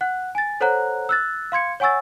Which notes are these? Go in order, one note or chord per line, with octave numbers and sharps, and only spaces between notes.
F#5 F#6
G#5 A6
A4 C5 C#5 F#5 A#5 F#6
E6 F#6 A6
F5 C6 G#6 C#7
C#5 F#5 G#5 C#6 E6 A6